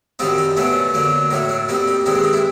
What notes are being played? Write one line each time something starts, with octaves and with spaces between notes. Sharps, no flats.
F#2 D#3 G3 C4 D#4 F4
D#4
B2 F#3 A3 C#4 D4
D3 F#3 A#3 D4
A2 F#3 A3 D#4
D4
A#2 G3 C4 D#4
D#4
G2 D#3 G#3 C4 D#4
D4
D#4
D4 E4